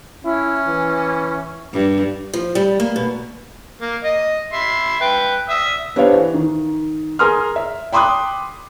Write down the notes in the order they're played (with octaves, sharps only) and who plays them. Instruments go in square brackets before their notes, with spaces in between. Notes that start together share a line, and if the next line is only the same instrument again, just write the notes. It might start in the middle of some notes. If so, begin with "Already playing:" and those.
[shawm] C#4 [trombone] E4
[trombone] E3
[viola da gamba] G2
[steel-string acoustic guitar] F3
G3
A#3
B2
[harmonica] A#3
D#5
E5 B5 C6
B4 G5
E5 D#6 E6
[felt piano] B3 D4 G4 C5 C#5 F5
E3
D#3
G#4 A#4 G#5 C6 D#6 F6
E5
G5 B5 C6 D6 D#6 F#6